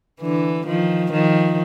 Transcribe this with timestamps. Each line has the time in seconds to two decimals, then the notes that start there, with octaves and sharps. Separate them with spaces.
0.21 D3 E3
0.67 D#3 F3
1.13 D#3 F3